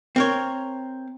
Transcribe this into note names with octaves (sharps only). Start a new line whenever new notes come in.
C4 A#4 C#5